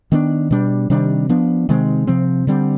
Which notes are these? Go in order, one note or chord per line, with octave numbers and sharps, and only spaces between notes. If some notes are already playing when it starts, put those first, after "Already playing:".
D#3 B3 D4
B2 G3 D4
C3 D#3 G3 D4
F3 B3 D4
C3 D#3 G#3 C4
C3 F3 C4
D3 G3 C4